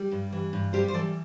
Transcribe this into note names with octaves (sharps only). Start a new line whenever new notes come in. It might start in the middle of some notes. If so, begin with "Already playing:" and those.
Already playing: G3
G2
E3
G2
G3 G4 C5
C5
E3 A4 D5